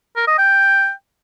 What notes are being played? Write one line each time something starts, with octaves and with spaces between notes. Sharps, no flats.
A#4
D#5
G5